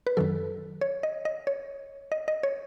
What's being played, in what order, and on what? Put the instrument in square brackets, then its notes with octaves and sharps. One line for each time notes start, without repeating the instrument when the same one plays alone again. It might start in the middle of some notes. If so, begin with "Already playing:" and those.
[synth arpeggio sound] B4
F#2 D#3 F#3 A4
C#5
D#5
D#5
C#5
D#5
D#5
C#5